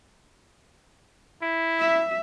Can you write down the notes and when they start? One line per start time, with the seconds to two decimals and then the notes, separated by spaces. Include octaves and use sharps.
1.42 E4
1.79 E5